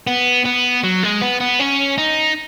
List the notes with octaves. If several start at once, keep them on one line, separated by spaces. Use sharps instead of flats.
B3
B3
F#3
G#3
B3
B3
C#4
D#4